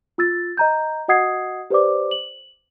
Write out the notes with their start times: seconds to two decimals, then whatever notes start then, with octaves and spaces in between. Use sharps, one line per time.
0.18 F4 E6 A6
0.57 D#5 A#5 G6
1.08 F#4 D#5 F#5 D#6 G#6 C7
1.70 G4 B4 C5 D5 D6
2.11 F#7